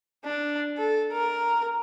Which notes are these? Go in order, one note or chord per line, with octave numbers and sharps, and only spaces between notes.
D4
A4
A#4